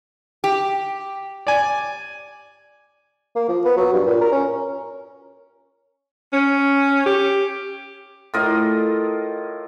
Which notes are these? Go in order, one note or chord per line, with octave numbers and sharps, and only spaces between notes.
G4
D5 G#5
A#3
F3
B3
F#3
G2
A#2
A#4
C#4
C#4
G4
A2 F4 A#4 D#5